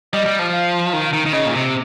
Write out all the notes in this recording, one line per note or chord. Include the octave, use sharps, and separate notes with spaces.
G3 D#5
G3
F3
F5
D#3
D#3
D#3
C#3 D#5
A#2
C3